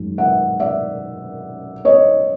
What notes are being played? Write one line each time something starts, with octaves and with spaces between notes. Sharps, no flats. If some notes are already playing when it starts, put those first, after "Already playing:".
Already playing: F#2 D#3 G#3
E5 F#5
D5 E5
C#5 D#5